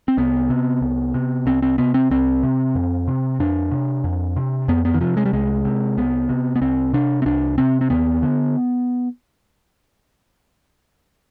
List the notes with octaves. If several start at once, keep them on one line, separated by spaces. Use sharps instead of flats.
C4
C2 B3
C3
C2
C3
C2 C4
C4
C3 B3
C4
C2 C4
C3
F2
C3
F2 D4
C3
F2
C3
F2 B3
B3
D#3
C3 F3
G#3
G3
C2 G#3
C3
C2 B3
C3
B3
C2 C4
C3 D4
C4
C2 D4
C3 C4
C4
D#2 B3
D3